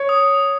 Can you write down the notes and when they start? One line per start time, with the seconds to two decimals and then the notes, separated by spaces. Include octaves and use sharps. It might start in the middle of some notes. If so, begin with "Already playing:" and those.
Already playing: C#5
0.09 D#6